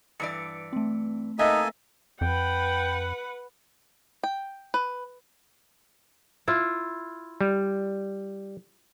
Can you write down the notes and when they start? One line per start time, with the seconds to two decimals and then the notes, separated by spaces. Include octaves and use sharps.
0.20 G2 E3 D5 C#7 D7
0.73 A3 C4
1.39 A#3 D#4 A4 B4 D#5 E5 G#5
2.21 F2 B4 F#5 G5
4.23 G5
4.74 B4
6.48 E4 F4
7.41 G3